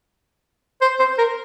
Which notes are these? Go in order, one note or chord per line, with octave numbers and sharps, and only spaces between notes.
C5
C5
A#4